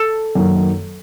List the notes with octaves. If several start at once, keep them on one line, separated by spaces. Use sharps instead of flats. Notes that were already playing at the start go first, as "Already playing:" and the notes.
Already playing: A4
F#2 D#3 F#3 A#3